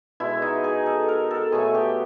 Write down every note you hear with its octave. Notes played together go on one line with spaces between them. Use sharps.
B2 G#3 E4
D#4
G#4
A4
A#4
A4
B2 F#3 A3 G#4
G4